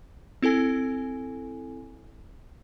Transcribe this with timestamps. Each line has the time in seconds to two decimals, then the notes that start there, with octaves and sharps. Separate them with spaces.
0.42 C4 E4 A4 G#5